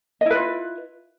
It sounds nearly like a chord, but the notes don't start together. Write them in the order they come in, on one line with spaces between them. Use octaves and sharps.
D#5 E4 B4 F4